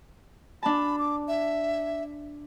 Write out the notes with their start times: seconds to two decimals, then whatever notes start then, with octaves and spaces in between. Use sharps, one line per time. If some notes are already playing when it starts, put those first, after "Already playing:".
0.63 D4 A5 B5
0.99 D6
1.28 E5